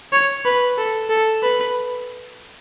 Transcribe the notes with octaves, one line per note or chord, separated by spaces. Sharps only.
C#5
B4
A4
A4
B4